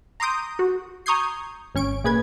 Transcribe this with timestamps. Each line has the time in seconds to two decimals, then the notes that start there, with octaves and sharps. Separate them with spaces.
0.20 A#5 C6 D6 D#6 G6
0.59 F#4
1.06 A#5 C#6 D#6 G6 G#6 C7
1.75 G#1 C#4 C#6 D7
2.04 A#2 G#4 B4 G#6